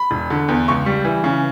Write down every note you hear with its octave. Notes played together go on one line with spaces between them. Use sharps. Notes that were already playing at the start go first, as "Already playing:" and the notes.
Already playing: B5
E1
D3
E2
C#2 C#6
G3
E3
C#3